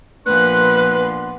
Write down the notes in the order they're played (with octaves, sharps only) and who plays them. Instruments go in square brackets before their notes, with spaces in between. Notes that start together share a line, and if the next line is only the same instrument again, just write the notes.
[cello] A#2 F3 [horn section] B3 D4 C6 [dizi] B4 [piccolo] F#6